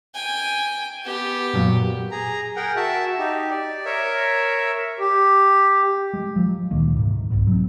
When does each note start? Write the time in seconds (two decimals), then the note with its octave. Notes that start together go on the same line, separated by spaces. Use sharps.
0.15 G5 G#5
1.05 B3 G4
1.54 F#2 A#2 F#3
2.11 G#4 A#5
2.56 G#4 A#4 F#5 G5
2.76 F#4 E5 A5
3.19 D#4 G4
3.50 D5
3.85 A#4 C#5 E5
4.99 G4
6.14 G#3
6.36 F3 F#3
6.71 D2 A#2 D#3 A#3
6.96 G#2 C3
7.30 C2 G#2 B2
7.47 F#3 C4